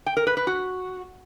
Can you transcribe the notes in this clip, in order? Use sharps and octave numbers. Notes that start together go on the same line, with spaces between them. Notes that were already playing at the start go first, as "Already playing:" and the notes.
G5
A#4
B4
B4
F#4